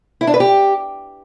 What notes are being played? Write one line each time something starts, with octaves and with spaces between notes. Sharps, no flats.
E4
D4
B4
G4